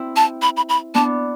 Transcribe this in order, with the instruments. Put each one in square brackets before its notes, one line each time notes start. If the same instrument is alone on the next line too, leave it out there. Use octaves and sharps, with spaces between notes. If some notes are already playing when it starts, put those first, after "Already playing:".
Already playing: [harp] C4 E4
[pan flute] A5
B5
B5
B5
[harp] B3 D4 [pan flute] A5